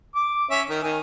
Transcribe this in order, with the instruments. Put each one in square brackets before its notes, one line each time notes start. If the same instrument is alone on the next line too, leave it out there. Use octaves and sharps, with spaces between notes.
[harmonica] D6
C#4 C#5 E5
D#3
D#3 G#5